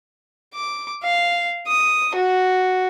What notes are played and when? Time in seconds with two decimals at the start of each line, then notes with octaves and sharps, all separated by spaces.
0.54 D6
1.03 F5
1.67 D#6
2.16 F#4